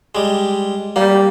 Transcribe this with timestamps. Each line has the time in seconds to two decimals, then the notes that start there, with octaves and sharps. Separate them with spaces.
0.15 G3 G#3
0.96 G3 A#3